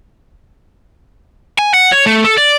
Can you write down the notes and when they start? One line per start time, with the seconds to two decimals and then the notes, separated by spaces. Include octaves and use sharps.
1.59 G#5
1.74 F#5
1.92 C#5
2.06 A3
2.24 A4
2.38 D5